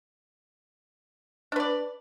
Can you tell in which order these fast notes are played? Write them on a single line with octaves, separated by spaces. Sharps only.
D4 B4 D5